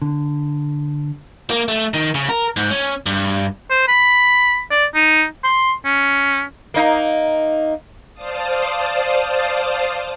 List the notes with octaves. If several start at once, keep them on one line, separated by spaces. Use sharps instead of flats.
D3
A#3
A3
D#3
C#3
A#4
G#2
C#4
G2
C5
B5
D5
D#4
C6
C#4
A#3 D#4
C5 D5 F5 A5 D#6